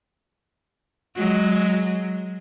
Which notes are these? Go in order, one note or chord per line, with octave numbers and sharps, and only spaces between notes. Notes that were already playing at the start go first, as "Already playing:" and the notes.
F#3 G#3